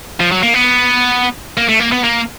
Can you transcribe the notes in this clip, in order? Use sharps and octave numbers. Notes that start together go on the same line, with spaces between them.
F3
F#3
A#3
B3
A#3
A3
A#3
B3
A#3